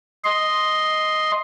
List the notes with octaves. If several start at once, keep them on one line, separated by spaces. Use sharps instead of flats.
D#5 C6